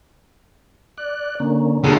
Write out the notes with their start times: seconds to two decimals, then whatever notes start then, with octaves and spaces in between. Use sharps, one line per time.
0.98 D5 F#6
1.40 D3 A#3 C#4
1.84 D3 G#3 A#3 G4 A#5